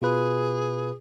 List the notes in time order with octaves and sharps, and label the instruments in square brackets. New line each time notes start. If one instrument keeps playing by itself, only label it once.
[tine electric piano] B2 F4 B4 [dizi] G#4